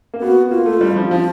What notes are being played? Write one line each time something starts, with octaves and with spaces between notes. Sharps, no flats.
A#3
B3 F#4
A#3 F4
A3
G3
F3
F3 F4